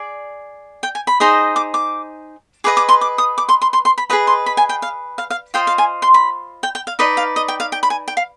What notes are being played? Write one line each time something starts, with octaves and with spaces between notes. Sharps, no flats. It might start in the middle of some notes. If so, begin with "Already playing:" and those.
Already playing: G#4 D5
G5
G#5
B5
D#4 G#4 C5 D#5
D6
D6
G#4 B4 D#5 D6
D6
C6
D6
D#6
D6
C6
C6
C6
C6
B5
G#4 B4 D#5 B5
C6
B5
G#5
G5
F5
F5
F5
F4 C5 D#5 G5
F5
G#5
C6
B5
G5
G5
F5
D#4 B4 D5 D#5
F5
D#5
G5
F5
G5
B5
G#5
G5
F5